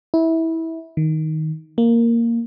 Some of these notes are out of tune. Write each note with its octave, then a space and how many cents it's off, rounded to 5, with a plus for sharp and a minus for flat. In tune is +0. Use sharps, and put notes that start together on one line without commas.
E4 -20
D#3 +10
A#3 -5